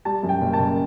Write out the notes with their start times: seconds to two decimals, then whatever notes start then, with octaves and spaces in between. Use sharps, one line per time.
0.05 G3 A5
0.23 F#2
0.29 G5
0.41 F#1
0.53 A5
0.59 F#1